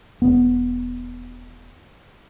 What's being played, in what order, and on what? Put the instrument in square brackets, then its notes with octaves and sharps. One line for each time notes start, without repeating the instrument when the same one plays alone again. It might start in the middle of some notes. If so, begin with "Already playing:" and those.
[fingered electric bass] E1 B3